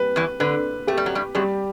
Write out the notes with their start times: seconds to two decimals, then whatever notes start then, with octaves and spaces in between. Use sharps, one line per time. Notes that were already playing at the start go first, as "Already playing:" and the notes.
Already playing: G3 B4
0.16 E2 E3
0.40 D3 B4
0.87 A3 G4
0.97 G3
1.06 F#3
1.15 G2 G3
1.35 F#2 F#3 G3